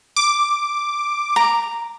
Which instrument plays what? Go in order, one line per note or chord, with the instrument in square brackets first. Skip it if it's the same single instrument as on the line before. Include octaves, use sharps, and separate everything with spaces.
[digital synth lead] D6
[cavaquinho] A#5